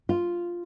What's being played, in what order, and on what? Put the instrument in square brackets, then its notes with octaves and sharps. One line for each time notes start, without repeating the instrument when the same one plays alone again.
[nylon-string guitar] F4